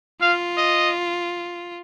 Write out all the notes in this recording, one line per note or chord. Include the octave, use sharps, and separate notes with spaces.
F4 F5
D#5